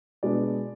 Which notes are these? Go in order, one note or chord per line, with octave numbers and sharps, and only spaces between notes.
B2 G#3 B3 D4 D5